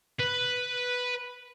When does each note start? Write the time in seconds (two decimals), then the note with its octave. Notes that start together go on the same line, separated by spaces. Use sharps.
0.20 B4